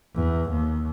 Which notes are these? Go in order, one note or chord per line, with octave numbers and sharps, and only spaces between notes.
E2
D#2